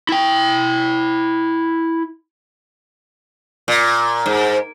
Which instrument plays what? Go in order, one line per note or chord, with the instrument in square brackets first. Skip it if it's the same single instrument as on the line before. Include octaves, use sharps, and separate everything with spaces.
[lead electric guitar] E4 G5
[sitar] A#2
G#2